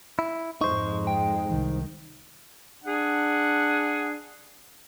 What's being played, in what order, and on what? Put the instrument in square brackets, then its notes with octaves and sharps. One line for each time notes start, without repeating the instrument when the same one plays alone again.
[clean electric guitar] E4
[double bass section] F2 G#2 G#3 [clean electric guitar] D#4 C5 [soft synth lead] C#6
[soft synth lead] G5
[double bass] C2 D#3
[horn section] D4 G#4 F#5